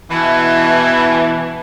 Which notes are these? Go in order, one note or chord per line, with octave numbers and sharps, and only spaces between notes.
B2 E3